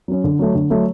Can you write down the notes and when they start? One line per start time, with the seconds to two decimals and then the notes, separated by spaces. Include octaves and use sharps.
0.08 F#3 C#4
0.24 D3
0.39 F#3 A3
0.55 D3
0.70 F#3 A3